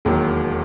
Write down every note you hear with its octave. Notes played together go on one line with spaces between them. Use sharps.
E1 D#2 D#3 F#3